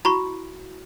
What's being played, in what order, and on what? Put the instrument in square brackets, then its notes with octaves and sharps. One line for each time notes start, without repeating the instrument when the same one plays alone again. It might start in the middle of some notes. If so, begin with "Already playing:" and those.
[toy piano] E4 F#4 [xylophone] A#5 B5 C#6